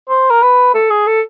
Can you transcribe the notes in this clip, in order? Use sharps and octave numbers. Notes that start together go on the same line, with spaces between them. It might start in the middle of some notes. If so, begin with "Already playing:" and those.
C5
A#4
B4
A4
G#4
A4